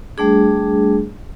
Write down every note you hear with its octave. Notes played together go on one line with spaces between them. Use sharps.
G3 A3 D4 G#4